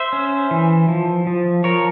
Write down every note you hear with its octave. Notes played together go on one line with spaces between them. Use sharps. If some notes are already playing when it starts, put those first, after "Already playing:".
Already playing: C5 E5
C#4
E3
F3
F3
F3 A#4 C#5